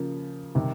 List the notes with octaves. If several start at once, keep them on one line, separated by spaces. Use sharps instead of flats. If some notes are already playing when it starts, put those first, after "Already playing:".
Already playing: C#3 F3 A#3
C3 D#3 G3